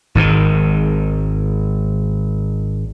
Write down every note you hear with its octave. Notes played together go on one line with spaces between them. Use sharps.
G#1 G#2 B2 D#3